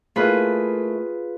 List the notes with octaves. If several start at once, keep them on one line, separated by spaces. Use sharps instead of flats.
A3 A#3 E4 F4 G#4 B4